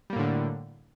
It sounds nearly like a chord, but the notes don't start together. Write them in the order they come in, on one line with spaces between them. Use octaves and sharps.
G3 A#3 A2 D3